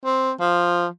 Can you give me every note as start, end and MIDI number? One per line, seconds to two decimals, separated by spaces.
0.05 0.32 60
0.40 0.86 53